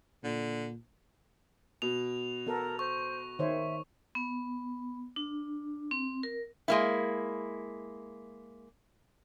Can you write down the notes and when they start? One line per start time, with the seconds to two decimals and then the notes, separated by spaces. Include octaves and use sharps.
0.24 A#2 D3
1.82 B2 F7
2.47 B3 A4 A#4
2.79 C5 C#6
3.39 D#3 C5 C#5 E5
4.15 B3
5.16 D4
5.91 C4
6.23 A#4
6.68 G#3 A#3 E4